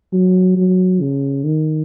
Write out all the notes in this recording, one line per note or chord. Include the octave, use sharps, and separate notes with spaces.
F#3
F#3
C#3
D#3